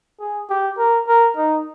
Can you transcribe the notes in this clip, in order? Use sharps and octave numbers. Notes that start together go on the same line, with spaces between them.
G#4
G4
A#4
A#4
D#4